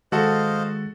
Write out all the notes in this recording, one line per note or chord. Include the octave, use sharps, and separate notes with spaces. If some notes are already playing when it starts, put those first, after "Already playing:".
D#3 G#3 F#4 A4 C5 D#5 F5 A#6